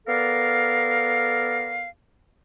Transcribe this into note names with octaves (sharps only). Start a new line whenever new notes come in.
B3 A4 A#4 D5 F5